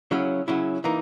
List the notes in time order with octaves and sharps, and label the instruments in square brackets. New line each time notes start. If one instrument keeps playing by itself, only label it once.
[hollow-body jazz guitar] C#3 F#3 C#4 E4
C#3 F#3 C#4 E4
E3 A#3 D#4